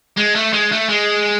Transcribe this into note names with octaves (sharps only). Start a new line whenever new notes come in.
G#3
A3
G#3
A3
G#3